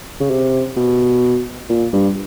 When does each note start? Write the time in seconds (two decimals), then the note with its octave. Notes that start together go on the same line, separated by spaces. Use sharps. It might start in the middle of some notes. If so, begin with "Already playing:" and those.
0.20 C#3
0.30 C3
0.77 B2
1.70 A#2
1.93 G2